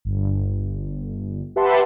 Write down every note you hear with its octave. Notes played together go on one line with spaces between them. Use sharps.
G1
G4 B4 E5 F#5 A5 C6